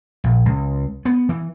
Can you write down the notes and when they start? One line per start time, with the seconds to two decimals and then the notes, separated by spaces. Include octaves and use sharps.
0.24 A#1
0.46 C#2
1.05 B3
1.29 E3